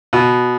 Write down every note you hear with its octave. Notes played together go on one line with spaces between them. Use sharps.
B2